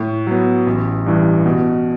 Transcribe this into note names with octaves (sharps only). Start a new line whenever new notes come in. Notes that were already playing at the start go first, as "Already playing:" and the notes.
Already playing: A2
F#3 B3
A1
G2 E3
B2